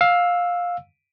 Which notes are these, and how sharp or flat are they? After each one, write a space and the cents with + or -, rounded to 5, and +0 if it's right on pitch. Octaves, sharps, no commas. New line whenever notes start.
F5 +15 E6 +0